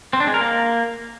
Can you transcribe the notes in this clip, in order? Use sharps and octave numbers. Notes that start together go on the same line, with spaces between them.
C4
D4
G#3
A#4
A#3